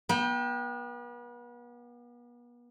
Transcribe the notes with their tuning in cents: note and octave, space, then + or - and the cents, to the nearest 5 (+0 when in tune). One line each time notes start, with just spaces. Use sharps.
B3 -40 G5 +0